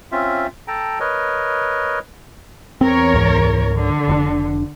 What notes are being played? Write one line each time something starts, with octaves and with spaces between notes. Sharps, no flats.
C4 C#4 F4 E5
A4 G5 A5 A#5
A#4 B4 C#5 D#5
E2 C4 A#4 C#5
C#2 G#2
D3
F1 D4